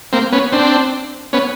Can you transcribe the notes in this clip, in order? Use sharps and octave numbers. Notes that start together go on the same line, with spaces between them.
A#3 C4
B3 C#4
C4 D4
B3 C#4